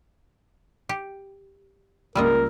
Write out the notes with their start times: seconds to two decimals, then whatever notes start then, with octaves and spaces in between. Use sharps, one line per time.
0.89 G4
2.15 C#2 G3 A#3 F4 A#4 D#5 E6